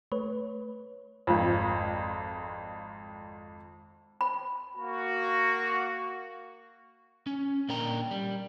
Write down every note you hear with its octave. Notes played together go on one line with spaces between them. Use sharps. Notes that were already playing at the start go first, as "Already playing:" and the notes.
A3 B4 C#5
G#1 F2
B5
A#3 F#4
C#4
A#2 D4 A#4 G5 A#5
G3